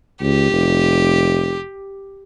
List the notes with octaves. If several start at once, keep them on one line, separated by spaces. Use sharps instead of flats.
C#2 G4
F1